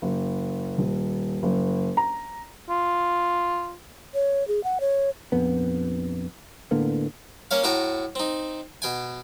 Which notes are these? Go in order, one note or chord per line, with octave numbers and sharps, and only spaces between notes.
F#1
D#1
F#1
A#5
F4
C#5
G#4
F#5
C#5
A#1 F2 B3
A2 D3 A#3 B3
A#3 C#4 C#5 F5
A2 F#4 A4 G5 A#5
C4 D#4
B2 G5 G#5